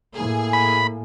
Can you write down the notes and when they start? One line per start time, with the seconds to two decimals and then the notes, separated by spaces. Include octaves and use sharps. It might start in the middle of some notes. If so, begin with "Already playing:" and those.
0.15 A2 A#3 G#4
0.53 B5